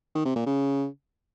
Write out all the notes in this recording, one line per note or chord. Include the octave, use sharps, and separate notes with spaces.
D#3
C3
A#2
C#3